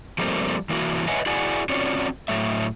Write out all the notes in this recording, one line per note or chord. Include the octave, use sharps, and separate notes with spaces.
F3 G3 A3 A#3 C4
E3 A#3 E4 F#4
B4 C#5 D#5 E5 F#5 G#5
E4 F#4 G#4 D5 F#5 G#5
C4 C#4 F4 F#4 C#5 D5
A2 F#3 A3 E5